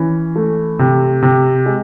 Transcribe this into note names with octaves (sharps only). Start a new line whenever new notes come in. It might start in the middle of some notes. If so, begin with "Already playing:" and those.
Already playing: E3 C#4
A3
C3
C3
G#3